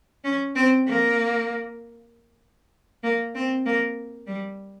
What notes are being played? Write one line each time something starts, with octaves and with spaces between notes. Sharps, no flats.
C#4
C4
A#3
A#3
C4
A#3
G3